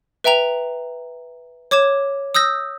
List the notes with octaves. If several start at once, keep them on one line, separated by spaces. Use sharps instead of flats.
B4 E5 G5 A#5 F7
C#5 D6 G#6 E7
D#6 E6 G6 A#6